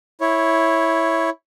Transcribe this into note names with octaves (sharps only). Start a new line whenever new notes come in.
E4 C#5